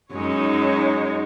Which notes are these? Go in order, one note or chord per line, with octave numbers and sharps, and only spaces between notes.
F#2 G#3 D#4 C#5